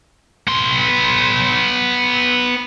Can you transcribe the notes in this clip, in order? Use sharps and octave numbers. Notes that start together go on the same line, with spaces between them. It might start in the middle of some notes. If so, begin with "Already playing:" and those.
B3 C6